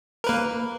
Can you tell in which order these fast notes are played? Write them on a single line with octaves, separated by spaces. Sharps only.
A#4 B4 A#3